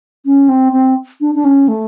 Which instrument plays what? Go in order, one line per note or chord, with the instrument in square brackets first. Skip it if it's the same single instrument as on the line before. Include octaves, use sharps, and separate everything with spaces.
[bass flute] C#4
C4
C4
D4
D4
C#4
A3